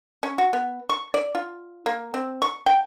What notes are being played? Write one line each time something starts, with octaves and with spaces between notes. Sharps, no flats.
C#4
F#4
B3
C#6
D5
F4
A#3
C4
C#6
G5